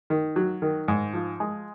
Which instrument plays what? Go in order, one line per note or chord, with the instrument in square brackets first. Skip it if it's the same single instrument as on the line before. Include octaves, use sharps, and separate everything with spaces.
[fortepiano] D#3
F#3
D#3
G#2
F3
G#3